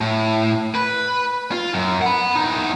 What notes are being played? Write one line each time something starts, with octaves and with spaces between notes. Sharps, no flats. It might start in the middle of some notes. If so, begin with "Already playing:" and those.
A2
B4
F4
F#2
F#5 B5
E2 D#4